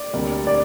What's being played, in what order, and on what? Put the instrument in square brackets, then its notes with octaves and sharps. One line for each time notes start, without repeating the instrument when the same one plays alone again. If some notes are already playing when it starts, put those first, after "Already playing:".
Already playing: [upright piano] D5
[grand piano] D2 C3 G3 A#3
[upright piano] D5